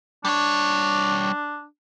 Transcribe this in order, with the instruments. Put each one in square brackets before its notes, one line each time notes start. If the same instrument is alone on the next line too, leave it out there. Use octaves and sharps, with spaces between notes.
[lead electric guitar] G3 C#5 [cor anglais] D4